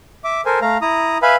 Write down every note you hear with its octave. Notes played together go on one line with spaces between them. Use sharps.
E5 D6
A4 A#4 C5 G#5
A3 F5 A#5
E4 A#5 D#6
B4 E5 F5 G#5 B5